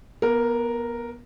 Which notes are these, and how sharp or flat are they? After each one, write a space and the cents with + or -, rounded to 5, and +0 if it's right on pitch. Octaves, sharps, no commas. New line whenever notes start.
B3 -25 A#4 +0